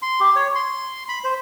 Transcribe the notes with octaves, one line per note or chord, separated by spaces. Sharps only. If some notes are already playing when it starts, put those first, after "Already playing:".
C6
G4
C#5
C6
B5
C5